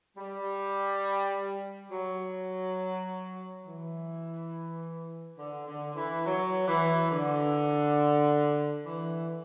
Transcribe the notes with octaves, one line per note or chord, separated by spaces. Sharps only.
G3
F#3
E3
D3
D3
E3
F#3
E3
D3
E3